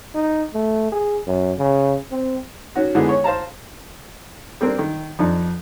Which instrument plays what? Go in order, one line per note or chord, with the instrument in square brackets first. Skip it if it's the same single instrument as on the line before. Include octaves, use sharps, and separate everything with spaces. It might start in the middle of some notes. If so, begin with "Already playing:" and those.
[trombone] D#4
A3
G#4
F#2
C#3
C4
[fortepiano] D#3 C#4 F#4
G#2 D3 E3 B3 G#4
C#5
C5 F5 A5 A#5
G3 A#3 C4 D4
D#3
F2 D4 D#4